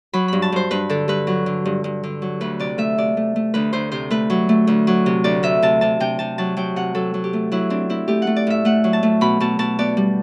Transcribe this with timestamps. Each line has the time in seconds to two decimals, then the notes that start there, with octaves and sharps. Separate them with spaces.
0.13 F#3 B5
0.28 G2 B5
0.42 A5
0.52 G2 C5
0.71 G2 B4
0.90 D3 A4
1.08 G2 B4
1.27 F#3
1.46 D3
1.65 G2
1.84 G2
2.03 D3
2.22 F#3
2.41 D2 B4
2.59 C3 D5
2.78 A3 E5
2.98 C3 D5
3.17 A3
3.36 A3
3.54 D2 B4
3.73 D2 C5
3.92 C3 C5
4.10 A3 B4
4.30 F#3
4.49 A3
4.67 D2
4.87 F#3
5.06 C3
5.24 D2 D5
5.43 C3 E5
5.62 C3 A5
5.81 C3 A5
6.00 C3 G5
6.19 C3 A5
6.38 F#3 A5
6.57 F#3 G5
6.76 C3 F#5
6.95 F#3 A4
7.14 F#3
7.24 G4
7.33 A3
7.52 F#3 E4
7.70 C4 D4
7.89 C4 E4
8.08 A3 G4
8.22 F#5
8.27 A3
8.36 D5
8.47 A2 E5
8.65 A3 F#5
8.84 F#3
8.93 A5
9.03 A3
9.21 B2 B5
9.40 B2 A5
9.59 B2 A5
9.79 B3 D5
9.97 G3